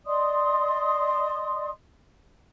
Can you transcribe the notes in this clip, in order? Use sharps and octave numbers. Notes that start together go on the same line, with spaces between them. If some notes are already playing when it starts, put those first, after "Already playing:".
D5 D#5 C6 D#6